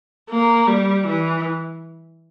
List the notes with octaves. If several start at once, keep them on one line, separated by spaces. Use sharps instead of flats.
A#3
G3
E3